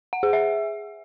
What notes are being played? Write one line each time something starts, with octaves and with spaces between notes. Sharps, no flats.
F#5
G#4
E5